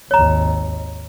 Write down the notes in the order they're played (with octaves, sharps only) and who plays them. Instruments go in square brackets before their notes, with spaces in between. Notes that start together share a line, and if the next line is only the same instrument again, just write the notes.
[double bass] G#1 D#2 [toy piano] C#5 A#5